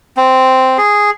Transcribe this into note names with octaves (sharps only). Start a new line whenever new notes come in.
C4
G#4